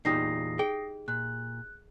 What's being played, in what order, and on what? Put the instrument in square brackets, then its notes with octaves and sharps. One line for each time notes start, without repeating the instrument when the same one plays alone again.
[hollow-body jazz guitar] E2 A#2 [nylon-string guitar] D#4 G4 [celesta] D#6 A#6 C7
[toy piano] G#4 [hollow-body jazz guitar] G5
[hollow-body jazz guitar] A#2 [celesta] F#6